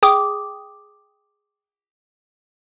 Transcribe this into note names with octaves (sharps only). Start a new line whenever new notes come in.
G#4 G5 D6 D#6